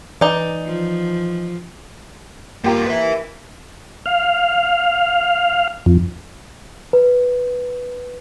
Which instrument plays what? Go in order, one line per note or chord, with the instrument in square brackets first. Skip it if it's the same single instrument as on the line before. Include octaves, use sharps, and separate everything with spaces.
[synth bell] E3 [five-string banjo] D#4 D5
[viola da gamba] F3
[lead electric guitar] G2 F4 [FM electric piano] A#3 G4 A#4
[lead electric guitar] B4 E5
[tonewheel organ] F5
F2
[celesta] B4